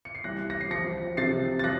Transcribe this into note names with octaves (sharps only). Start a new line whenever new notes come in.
C#7
C7
C2 F#6 A#6
A#6
C7
F3 A#6 C#7
C3 A6 C7
A6
F3 F#6 A#6